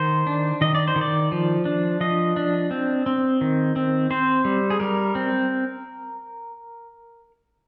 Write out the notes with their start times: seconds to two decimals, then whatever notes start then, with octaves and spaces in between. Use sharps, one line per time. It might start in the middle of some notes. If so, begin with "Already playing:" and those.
Already playing: D#3 C5
0.27 D4
0.61 D#3 D#5
0.75 D5
0.88 C5
0.96 D#3
1.01 D5
1.32 F3
1.65 D4
2.01 F3 D#5
2.36 D4
2.71 C4
3.06 C4
3.41 D#3
3.76 C4
4.10 C4 C5
4.45 G3
4.70 G#4
4.80 G3 A#4
5.15 C4